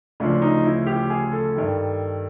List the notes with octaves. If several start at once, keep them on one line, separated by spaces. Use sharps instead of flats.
D2 C#3 F3 D4
D#4
E4
G4
G#4
A4
G2 D#3